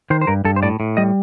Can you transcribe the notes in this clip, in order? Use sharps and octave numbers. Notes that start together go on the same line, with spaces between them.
D#3 C5
C5
G2 A#4
G2 A4
C5
A2 D5
A2
G3 D#5